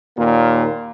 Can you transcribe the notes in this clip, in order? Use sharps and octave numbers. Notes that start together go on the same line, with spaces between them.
D#2 A#2 A#3